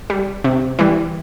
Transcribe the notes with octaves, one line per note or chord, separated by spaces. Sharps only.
G3
C3
E3 G3